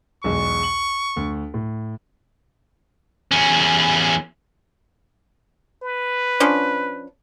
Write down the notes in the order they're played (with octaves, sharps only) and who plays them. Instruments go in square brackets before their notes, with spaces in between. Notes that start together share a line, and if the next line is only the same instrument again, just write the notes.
[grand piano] B1 E2 G#3 [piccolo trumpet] C#6
[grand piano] F#7
D2
A2
[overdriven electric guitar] E2 C#4
[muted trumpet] B4
[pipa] F3 C#4 D4